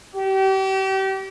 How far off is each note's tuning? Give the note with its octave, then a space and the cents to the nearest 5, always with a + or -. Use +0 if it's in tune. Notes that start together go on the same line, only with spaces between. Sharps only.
G4 -35